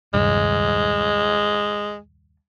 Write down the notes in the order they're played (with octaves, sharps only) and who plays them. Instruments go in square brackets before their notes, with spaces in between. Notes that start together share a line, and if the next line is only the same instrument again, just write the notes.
[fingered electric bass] D#1 C2 G2 [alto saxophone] G#3